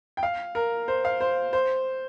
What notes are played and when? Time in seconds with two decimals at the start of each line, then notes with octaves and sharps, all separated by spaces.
0.17 G5
0.23 F5
0.55 A#4
0.88 C5
1.05 F5
1.21 C5
1.53 C5